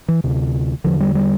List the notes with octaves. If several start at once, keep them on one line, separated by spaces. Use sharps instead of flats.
E3
D2 C3
E2 D3 F3
G3
G3